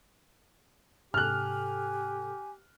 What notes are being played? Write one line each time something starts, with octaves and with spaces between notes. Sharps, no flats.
G#2 C3 G4 A4 G#5 F6 F#6